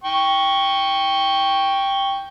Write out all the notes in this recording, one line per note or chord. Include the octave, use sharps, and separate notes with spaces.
G5 C#6